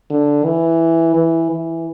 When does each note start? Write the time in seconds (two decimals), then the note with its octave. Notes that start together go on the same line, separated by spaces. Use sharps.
0.10 D3
0.45 E3
1.15 E3
1.50 E3